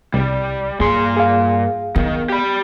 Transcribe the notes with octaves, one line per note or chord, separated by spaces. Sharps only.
C2 G3
G2 A#2 G#4 C6
G#4 F5
D#3 B3
G4 B5